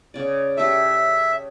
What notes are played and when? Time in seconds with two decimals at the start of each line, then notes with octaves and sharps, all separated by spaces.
0.14 C#3 D5
0.57 A3 G4 E5